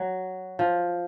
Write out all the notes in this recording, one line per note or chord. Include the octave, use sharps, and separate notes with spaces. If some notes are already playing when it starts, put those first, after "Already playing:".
Already playing: F#3
F3